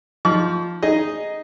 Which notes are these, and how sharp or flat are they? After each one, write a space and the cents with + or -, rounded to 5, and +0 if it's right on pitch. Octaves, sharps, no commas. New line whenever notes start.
F3 +0 D#4 +0 C#6 +40
D#4 +0 G#4 +0 D#5 +0